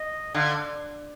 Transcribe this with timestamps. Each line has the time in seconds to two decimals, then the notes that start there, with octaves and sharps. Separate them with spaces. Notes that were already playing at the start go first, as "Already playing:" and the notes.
Already playing: D#5
0.34 D3 F5